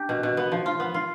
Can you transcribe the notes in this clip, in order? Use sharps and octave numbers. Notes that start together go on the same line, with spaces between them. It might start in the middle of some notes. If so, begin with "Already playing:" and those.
Already playing: D4 G4
B2
B2
B3
F3
F4
B3
F4